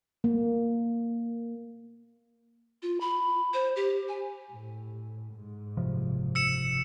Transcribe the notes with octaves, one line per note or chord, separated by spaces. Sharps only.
A#3
F4
B5
C5
G4
G#5
A2
G#2
F#1 C3 F3
E6 C#7 E7